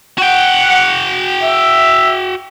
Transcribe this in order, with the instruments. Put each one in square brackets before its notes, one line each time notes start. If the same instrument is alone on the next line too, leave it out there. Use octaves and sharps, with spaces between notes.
[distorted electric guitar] F#4 G5 [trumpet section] F#5
[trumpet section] E5